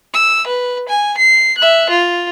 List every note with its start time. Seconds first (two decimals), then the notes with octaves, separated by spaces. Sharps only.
0.14 E6
0.47 B4
0.89 G#5
1.18 C7
1.58 E5 F#6
1.90 F4